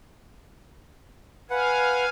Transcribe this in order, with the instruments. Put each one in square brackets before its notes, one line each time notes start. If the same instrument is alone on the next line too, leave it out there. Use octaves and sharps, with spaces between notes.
[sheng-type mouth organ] B4 F#5 [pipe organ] F5 G#5